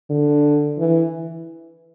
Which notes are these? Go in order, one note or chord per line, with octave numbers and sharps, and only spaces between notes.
D3
E3